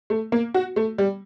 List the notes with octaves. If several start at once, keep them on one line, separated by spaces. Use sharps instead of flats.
A3
A#3
F#4
A3
G3